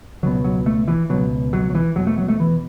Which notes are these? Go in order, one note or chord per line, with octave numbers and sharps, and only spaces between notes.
C#2 B2 F#3
F#3
A3
E3
C#2 B2 F#3
F#3
F#3
E3
E2 B2 F#3
A3
F#3
A3
E3